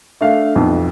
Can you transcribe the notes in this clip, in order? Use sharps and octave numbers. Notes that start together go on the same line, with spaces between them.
A3 D4 E5 F5
B1 F2 B2